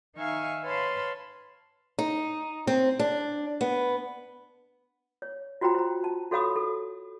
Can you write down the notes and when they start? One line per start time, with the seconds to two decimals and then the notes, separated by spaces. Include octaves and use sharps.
0.15 D#3 D#4 E5 F5 G#5 C#6
0.64 B4 C#5 F5 A5 B5 C6
1.99 D#4
2.67 C4
2.99 D4
3.61 B3
5.22 C#5
5.61 F4 F#4 C5 G5 A#5
5.75 C5 A#5
6.04 A5
6.31 F#4 A4 C#5 F5 B5 D#6
6.56 A4